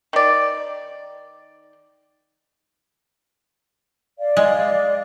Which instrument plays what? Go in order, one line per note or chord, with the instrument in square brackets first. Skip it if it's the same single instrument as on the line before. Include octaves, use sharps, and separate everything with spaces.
[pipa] D#3 D5
[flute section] D5 F5
[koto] G#3